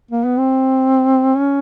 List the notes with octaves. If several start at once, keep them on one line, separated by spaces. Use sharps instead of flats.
A#3
B3
C4
C#4